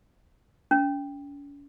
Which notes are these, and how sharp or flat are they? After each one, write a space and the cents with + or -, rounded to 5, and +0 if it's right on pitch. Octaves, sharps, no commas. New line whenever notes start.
C#4 +45